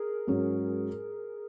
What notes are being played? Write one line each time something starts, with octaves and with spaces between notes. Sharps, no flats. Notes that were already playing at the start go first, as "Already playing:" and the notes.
Already playing: G#4 A#4
G#2 F#3 C#4